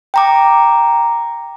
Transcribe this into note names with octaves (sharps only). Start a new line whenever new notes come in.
G5 A#5 D6